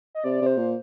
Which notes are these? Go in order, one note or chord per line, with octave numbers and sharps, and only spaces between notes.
D#5
C3 D5
C3
C5
A#2